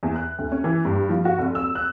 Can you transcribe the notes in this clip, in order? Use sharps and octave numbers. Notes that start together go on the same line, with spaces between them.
E2
F#6
D2
C#4
E3
G2
F3
F#4
F1
E6
F#6